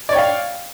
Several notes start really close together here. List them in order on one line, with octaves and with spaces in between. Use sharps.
D5 C#5 G5 F5